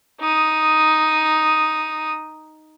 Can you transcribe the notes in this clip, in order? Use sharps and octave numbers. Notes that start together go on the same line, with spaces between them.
D#4 D#6